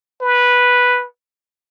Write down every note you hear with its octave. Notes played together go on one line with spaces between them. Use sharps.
B4